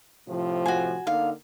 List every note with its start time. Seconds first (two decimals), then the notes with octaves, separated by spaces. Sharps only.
0.28 A2 C3 F3
0.66 F#4 G#5
1.07 D3 A#3 D#4 F5